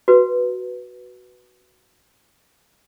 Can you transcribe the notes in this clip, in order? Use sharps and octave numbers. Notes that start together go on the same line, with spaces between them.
F#4 B4